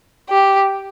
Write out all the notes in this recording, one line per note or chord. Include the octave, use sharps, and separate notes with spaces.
G4